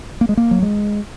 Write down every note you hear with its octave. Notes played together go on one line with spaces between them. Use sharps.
A#3
G#3
A#3
F#3
G#3